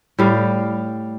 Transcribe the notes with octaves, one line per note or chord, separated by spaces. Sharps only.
A2 G3 F5